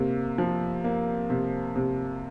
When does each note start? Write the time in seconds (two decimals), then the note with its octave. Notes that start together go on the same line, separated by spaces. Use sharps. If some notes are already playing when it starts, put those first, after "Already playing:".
Already playing: C3 A#3
0.38 F3
0.84 A#3
1.30 C3
1.76 C3